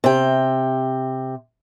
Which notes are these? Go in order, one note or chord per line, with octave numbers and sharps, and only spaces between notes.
C3 G5